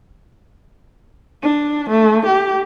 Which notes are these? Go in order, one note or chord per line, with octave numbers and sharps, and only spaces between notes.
D4
A3
G4